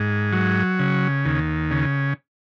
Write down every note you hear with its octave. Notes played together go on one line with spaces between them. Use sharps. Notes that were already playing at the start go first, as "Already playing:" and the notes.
Already playing: G#2
F#3
C#3
D#2
C#3